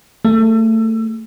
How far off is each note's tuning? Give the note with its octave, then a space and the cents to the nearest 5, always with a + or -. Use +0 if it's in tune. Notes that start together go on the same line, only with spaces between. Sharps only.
A3 +25 G#4 +15